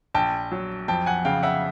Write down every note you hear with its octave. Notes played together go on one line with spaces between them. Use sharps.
A#1 G5 A5
F#3
F2 G5 A5
F#5 G#5
C#3 F5 G5
E5 F#5